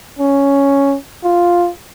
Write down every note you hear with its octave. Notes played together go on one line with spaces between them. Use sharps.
C#4
F4